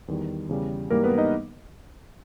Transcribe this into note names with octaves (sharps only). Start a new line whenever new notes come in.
E2 D#3 G3
E2 C#3 G3
G#2 E3 G3 A#3 A#4
B3 B4
D#4 D#5